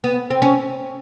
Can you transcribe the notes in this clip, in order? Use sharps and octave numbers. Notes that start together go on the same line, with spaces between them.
B3
C4
C#4